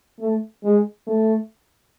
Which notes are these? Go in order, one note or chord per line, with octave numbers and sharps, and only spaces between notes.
A3
G#3
A3